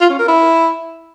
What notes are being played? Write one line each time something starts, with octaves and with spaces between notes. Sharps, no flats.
F4
C#4
A#4
E4